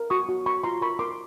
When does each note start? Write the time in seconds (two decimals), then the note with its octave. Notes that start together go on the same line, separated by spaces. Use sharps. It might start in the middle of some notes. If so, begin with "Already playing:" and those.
Already playing: A#4
0.10 F#4 C#6 D#6
0.29 F#4
0.46 A#4 B5 C#6
0.64 F4 A#5 C6
0.81 A#4 B5 C#6
0.99 A#4 C6 D6